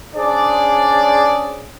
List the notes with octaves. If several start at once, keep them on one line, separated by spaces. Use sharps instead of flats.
C#4 D4 G#4 C5 D5